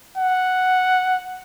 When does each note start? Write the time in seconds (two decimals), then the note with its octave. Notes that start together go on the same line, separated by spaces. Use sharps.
0.18 F#5